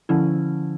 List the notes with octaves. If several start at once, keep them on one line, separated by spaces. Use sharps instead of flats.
D3 F3 C#4 E4